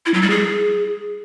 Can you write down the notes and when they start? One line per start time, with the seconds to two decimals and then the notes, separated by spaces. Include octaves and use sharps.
0.06 E4
0.14 F#3
0.22 G3
0.30 G#4